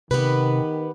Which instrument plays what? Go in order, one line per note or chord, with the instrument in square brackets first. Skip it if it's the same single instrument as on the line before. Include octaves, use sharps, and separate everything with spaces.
[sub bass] C3 [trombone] D#3 [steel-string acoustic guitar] B3 G4 B4